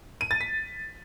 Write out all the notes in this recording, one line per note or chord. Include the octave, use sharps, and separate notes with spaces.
D#7
A6
B6